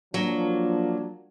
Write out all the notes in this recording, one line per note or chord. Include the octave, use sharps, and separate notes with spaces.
F3 F#3 A#3 D4